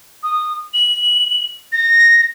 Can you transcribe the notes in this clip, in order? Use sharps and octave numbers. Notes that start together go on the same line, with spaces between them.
D#6
F#7
A#6